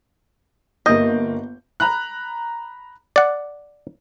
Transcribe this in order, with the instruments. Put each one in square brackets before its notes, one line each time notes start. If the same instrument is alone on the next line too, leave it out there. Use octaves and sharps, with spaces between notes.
[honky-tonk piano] G1 A#3 G6 [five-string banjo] D#5
[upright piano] A#5 B5 F#6
[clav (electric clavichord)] D5 F#5